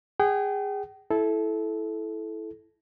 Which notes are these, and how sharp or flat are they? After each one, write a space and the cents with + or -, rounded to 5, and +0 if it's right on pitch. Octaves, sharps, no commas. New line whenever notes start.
G#4 -20 G5 -40
E4 +0 A4 -20